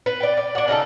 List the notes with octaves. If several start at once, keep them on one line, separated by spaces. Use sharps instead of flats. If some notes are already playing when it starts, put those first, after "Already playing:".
B4
D5 G5
D5
D4 F#5
C#3 D#4 G4 A4